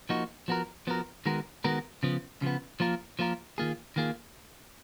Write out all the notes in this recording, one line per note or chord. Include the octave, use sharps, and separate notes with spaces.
F3 A#3 D#4 F#4
F3 B3 F#4 A#4
F3 B3 F#4 A#4
D#3 G#3 B3 F#4 A#4
D#3 G#3 B3 F#4 A#4
C#3 F3 B3
C#3 F3 B3
F3 A#3 F4 A#4
F3 A#3 F4 A#4
D#3 A#3 F4 G#4
D#3 A#3 F4 G#4